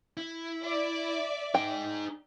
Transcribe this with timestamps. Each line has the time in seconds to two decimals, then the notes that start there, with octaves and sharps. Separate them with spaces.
0.17 E4
0.61 D5 E5
1.54 D#4 G#4 G5